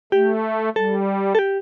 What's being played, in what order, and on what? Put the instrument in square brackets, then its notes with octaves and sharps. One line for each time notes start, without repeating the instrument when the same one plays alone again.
[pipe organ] A3 [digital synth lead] G4
[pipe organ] G3 [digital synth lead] A4
[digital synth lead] A4
G4